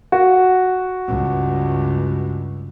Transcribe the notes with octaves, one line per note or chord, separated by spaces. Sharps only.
F#4
C#2 G2